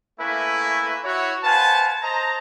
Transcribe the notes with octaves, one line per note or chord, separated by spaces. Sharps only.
A3 A#3 C#4 E4 B4 G#5
E4 F#4 C#5
B4 C5 F5 F#5 G#5 A5
C5 D#5 A5 A#5